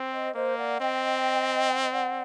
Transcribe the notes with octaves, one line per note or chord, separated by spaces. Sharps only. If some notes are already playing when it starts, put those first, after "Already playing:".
Already playing: C4
C5 D#5
A#3 C5 D#5
D5 F#5
C4 D#5 G5
F#5
D#5
D5 F#5